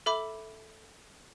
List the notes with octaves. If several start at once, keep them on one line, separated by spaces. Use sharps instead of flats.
A4 E5 B5 D6